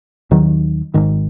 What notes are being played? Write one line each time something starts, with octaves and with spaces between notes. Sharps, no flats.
D#2 D#3 F#3
G#1 G#2 D#3